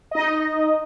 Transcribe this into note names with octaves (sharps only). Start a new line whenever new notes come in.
D#4 D#5